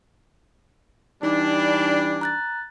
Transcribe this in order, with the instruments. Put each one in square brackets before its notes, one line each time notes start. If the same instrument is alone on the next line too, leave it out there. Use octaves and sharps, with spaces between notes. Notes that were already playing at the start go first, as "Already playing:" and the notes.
[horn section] E3 G3 D4 [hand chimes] D#4
[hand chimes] A#5 F#6 A6